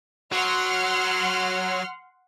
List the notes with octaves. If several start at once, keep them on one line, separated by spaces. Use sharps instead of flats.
F#3 F#5 C6 F6